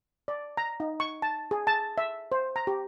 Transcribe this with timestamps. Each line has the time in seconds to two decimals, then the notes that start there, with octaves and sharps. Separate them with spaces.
0.28 D5
0.57 A#5
0.80 D#4
1.00 C#6
1.22 A5
1.51 G#4
1.67 A5
1.98 E5
2.32 C5
2.56 A#5
2.67 G4